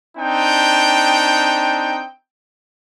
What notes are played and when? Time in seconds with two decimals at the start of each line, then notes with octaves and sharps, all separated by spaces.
0.17 C4 D4 D#4 G5